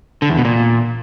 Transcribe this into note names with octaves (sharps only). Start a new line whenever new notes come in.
D3
E2
B2
A#2